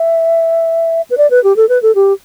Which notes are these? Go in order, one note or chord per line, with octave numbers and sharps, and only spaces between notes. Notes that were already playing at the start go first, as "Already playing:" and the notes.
Already playing: E5
B4
D5
B4
G4
A4
B4
A4
G4